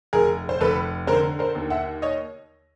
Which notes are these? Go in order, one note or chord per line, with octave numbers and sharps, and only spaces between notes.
F1 G#4 A#4
C5
F1 A4 B4
D3 A#4 C5
A#4 C5
D#2
E5 F#5
C#5 D#5